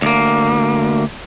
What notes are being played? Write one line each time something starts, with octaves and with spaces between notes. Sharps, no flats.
D2 A#3